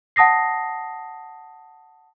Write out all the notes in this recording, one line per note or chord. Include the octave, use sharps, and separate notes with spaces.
F#5 A5 D#6 A#6 C7